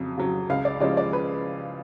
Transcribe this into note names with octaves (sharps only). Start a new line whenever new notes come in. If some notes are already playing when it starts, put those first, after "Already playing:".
Already playing: F2 C#3 F#3
C#3 F#3
C#2 F5
D5
C#3 F3 G#3 D5
D5
B4